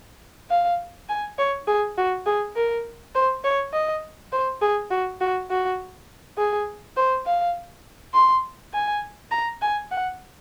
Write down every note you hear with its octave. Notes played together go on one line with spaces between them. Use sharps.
F5
G#5
C#5
G#4
F#4
G#4
A#4
C5
C#5
D#5
C5
G#4
F#4
F#4
F#4
G#4
C5
F5
C6
G#5
A#5
G#5
F#5